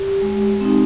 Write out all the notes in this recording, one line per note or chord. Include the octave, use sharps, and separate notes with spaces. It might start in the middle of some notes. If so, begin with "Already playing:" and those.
Already playing: G4
G#3
C4 D#4